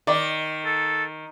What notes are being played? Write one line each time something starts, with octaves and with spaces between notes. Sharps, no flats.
D#3 D5
A4